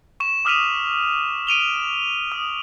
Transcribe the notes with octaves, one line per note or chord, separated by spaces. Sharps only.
C#6 E7
D6 D#6 F6 B6 D#7 F7
D7 D#7 F7 G7
D#6